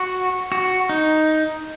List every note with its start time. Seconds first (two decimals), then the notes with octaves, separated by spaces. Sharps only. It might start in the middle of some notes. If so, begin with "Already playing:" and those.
Already playing: F#4
0.52 F#4
0.89 D#4